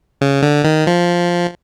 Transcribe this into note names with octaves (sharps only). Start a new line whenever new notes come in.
C#3
D3
D#3
F3